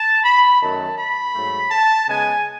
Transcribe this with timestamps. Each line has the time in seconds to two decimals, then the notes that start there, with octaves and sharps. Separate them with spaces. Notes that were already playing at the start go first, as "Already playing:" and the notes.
Already playing: A5
0.23 B5
0.60 F#2 D#3 F#3 A3 A5
0.97 B5
1.33 G#2 F#3 A3
1.70 A5
2.07 C#3 G#3 B3 G#5